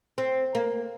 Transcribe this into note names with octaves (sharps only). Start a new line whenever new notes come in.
C4
A#3